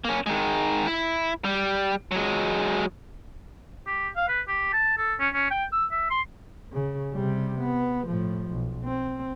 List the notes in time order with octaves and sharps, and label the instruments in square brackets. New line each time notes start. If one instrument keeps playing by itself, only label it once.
[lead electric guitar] A#3 C#4
D#3 G#3
E4
G3
F#3 G#3
[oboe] G4
F5
B4
G4
A5
A4
C#4
C#4
G5
E6
E5
C6
[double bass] C#3
C3 G3
B3
A2 F3
B1
C4